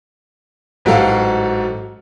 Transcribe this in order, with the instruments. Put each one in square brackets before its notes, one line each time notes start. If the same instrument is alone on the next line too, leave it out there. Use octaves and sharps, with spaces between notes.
[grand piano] A1 G#2 F#3 F#4 A4 F5